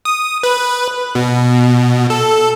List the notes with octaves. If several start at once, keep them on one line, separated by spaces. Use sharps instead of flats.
D#6
B4
B2
A4